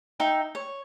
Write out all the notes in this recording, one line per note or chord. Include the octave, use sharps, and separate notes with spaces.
D#4 E5 G5
C#5